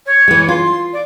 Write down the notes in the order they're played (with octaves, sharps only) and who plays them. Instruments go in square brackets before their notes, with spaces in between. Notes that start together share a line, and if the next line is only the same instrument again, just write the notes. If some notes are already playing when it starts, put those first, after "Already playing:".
[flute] C#5
[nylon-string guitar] E3 G#3
[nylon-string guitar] F4 [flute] C6
[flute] D5